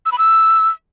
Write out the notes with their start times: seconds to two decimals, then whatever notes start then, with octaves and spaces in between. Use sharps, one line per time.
0.06 E6
0.12 B5
0.18 E6